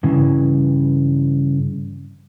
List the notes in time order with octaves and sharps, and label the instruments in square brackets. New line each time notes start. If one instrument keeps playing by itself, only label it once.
[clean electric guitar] G2 C#3 E3